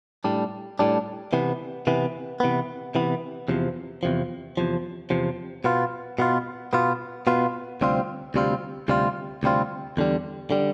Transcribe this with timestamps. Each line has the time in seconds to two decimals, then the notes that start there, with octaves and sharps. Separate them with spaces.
0.24 A2 G3 D4
0.79 A2 G3 D4
1.33 C3 E3 B3
1.87 C3 E3 B3
2.40 C3 E3 B3
2.95 C3 E3 B3
3.48 E2 C3 F3
4.03 E2 C3 F3
4.57 E2 C3 F3
5.10 E2 C3 F3
5.64 B2 B3 F4
6.19 B2 B3 F4
6.73 B2 B3 F4
7.27 B2 B3 F4
7.81 D2 C3 G3 C4 F4
8.34 D2 C3 G3 C4 F4
8.88 D2 C3 G3 C4 F4
9.43 D2 C3 G3 C4 F4
9.97 E2 D3 G3
10.51 D3 G3